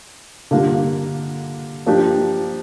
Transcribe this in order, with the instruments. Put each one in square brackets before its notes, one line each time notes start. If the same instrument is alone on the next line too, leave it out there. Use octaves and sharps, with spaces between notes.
[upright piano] D3 G3 A#3 D4 F4
F3 A#3 D4 G4